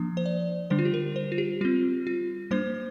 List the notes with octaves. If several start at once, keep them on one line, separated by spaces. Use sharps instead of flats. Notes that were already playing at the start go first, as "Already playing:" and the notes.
Already playing: F3 A#3 D4
C5
D5
D3 G3 D4 C5
F4
G4
A#4
C5
F4
G4
G3 C4 F4
F4
G3 A#3 D4 C5